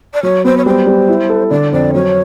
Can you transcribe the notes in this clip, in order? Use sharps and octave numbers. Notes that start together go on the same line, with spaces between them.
D5
F#3 C#5
B3 C5
C#5
G3 C5
G3
E4
A4
D3 D5
F2 D5
F#3 C#5